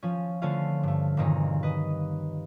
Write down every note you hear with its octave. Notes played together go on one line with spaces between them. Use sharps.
F3 C#4
D3 A3 C#4 F4 C5 F5
G2 A3
E1 G2 A#2 D#3 C4 D#4
B4 D#5